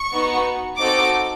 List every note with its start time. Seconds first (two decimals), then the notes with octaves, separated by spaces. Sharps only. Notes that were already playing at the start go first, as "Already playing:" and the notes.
Already playing: C#6
0.13 B3 D#4 F#4
0.78 C4 D#4 F#4 A4 D6